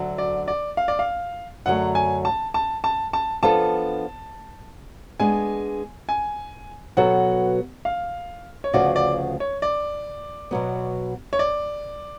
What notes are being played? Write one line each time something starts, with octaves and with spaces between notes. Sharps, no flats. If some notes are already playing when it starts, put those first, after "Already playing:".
Already playing: D2 D3 F#3
D5
D5
F5
D5
F5
F#2 D3 F#3 A3 F#5
G#5
A5
A5
A5
A5
F3 B3 D4 F4 A4 A5
G#3 B3 D4 G#5
G#5
B2 F#3 B3 F#4 A4 F#5
F5
C#5
D2 C#3 F3 B3 F#4 D5
D5
C#5
D5
B2 F#3 B3
C#5
D5